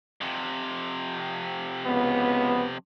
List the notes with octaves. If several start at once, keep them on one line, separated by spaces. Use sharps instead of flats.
F2 C3
C#2 B3